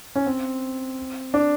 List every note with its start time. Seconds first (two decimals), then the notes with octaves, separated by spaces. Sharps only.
0.16 C#4
0.26 C4
1.34 D4